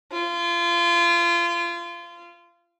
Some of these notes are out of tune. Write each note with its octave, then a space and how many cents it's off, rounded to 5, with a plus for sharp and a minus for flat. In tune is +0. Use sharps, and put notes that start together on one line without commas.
F4 -30